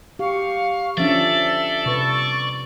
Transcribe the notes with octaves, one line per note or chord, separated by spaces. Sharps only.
G4 F5 C#6
F3 C#4 D4 A4 D5 E5
C3 B4 C#6